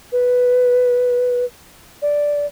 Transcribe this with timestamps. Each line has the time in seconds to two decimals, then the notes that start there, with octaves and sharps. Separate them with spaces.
0.12 B4
2.02 D5